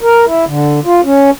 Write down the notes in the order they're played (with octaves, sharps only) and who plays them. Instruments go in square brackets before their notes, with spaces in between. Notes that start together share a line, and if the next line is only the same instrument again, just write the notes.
[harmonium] A#4
E4
D3
F4
C#4